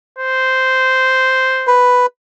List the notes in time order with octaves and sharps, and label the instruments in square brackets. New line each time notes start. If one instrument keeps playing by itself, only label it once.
[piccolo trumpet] C5
[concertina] B4